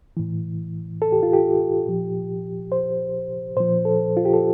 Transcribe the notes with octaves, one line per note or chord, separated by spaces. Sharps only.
A2 E3
A4
G4
F4
G4
A#2 F3
C5
A#2 F3 C5
A4
F4
G4
A4